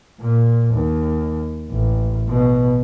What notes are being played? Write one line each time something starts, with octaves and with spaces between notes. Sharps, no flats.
A#2
D#2
A1
B2